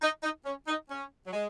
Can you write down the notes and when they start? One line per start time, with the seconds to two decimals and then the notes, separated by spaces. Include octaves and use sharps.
0.02 D#4
0.23 D#4
0.46 C#4
0.68 D#4
0.90 C#4
1.26 F#3
1.33 G#3